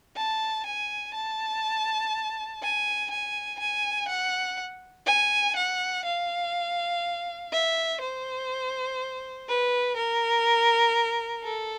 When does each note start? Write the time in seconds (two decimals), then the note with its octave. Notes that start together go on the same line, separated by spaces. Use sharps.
0.16 A5
0.66 G#5
1.14 A5
2.62 G#5
3.11 G#5
3.60 G#5
4.08 F#5
5.06 G#5
5.56 F#5
6.05 F5
7.52 E5
8.01 C5
9.48 B4
9.96 A#4
11.44 A4